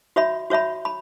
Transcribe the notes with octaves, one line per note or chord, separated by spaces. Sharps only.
F#4 C#5 E5 B5
F#4 C#5 E5 B5
B5